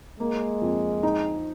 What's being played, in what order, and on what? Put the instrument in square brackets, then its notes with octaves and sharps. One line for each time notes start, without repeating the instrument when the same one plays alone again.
[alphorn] G#3 [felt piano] A#3
[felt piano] F2
D#4